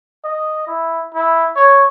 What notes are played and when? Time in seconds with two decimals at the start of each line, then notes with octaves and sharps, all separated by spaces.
0.24 D#5
0.67 E4
1.14 E4
1.57 C#5